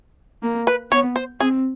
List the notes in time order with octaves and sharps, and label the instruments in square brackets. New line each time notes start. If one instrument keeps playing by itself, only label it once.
[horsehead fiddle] A#3
[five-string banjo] B4
[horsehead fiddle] B3 [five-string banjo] C#5
[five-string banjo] C5
[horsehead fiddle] C4 [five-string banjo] G#4